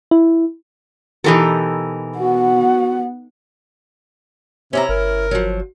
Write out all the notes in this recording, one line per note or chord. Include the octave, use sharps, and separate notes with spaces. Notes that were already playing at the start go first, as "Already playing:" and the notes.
E4
B2 E3 D#4 G4 A4 A#4
B3 F#4 F#5
C3 C#4 E4 A#5
G1 A#4
F3 F#3